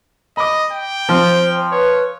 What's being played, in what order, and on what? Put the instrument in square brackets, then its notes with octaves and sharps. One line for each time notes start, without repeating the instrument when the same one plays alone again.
[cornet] D#5 [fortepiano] B5 D6
[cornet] G5
[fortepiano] F3 C4 [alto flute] C5
[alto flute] B4 [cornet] C#5